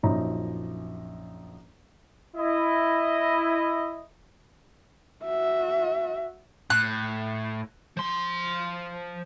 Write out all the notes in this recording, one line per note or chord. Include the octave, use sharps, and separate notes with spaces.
A#1 F#2 F3 C#4 D#4 A#5
E4 D#5
F#4 E5
A2 F#6
F3 C6